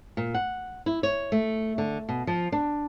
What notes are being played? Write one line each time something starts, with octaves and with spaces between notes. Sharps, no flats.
A#2
F#5
E4
C#5
A3
D3
B2
F3
D4